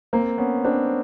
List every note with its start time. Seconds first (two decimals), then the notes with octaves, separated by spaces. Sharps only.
0.13 A#3 C4
0.38 B3 C#4
0.64 C4 D4